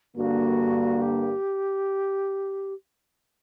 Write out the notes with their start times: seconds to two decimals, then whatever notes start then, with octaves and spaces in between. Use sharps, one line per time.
0.16 G2 D3 A#3 F#4
1.01 G4